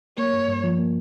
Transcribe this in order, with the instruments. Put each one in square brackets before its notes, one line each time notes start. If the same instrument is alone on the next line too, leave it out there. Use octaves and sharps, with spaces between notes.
[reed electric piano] A#3 [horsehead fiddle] C#5
[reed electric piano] G2
G2
F3
A#3